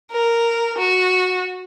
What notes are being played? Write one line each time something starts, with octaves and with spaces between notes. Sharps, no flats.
A#4
F#4